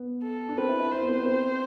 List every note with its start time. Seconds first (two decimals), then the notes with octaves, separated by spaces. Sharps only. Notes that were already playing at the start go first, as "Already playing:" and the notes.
Already playing: B3
0.23 A4
0.49 D4
0.57 C4 B4
0.69 E4
0.80 E4
0.92 E4 C5
1.02 B3
1.09 C4
1.19 B3
1.26 C4